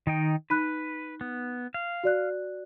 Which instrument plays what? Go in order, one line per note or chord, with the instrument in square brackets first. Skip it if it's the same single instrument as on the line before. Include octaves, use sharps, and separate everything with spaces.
[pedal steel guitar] D#3 D#4 G5
[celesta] D#4 B5 F#6 [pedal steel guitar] B4
[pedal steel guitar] B3
F5
[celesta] F#4 D5 F#6